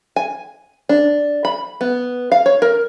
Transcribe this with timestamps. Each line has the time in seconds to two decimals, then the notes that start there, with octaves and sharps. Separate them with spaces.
0.16 G#5
0.89 D4
1.45 B5
1.81 B3
2.32 F5
2.46 C#5
2.62 A#4